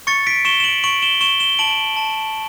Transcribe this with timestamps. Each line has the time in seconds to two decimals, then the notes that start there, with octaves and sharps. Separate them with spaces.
0.07 C#6 A6 C#7
0.27 B6 D7
0.45 C#6 E7 G7
0.60 E7
0.64 D7 F#7
0.84 C#6 D7 F#7
1.02 E7 G7
1.21 C#6 E7 G7
1.40 E7 G7
1.59 A5 D7 F#7
1.97 A5